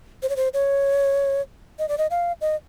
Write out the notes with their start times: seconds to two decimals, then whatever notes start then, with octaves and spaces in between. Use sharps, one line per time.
0.23 C5
0.29 C#5
0.36 C5
0.54 C#5
1.79 D#5
1.89 D5
1.98 D#5
2.10 F5
2.41 D#5